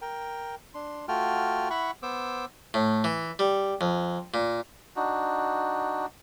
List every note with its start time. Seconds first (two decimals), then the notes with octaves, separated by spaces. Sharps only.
0.01 A#4 G5
0.74 D4 C6
1.08 A3 F4 F#4 G5 F6
1.70 E4 F#5 B5 C#6
2.03 B3 C5 D6 E6
2.74 A2
3.04 E3
3.39 G3
3.81 F2
4.34 A#2
4.96 D4 D#4 F#4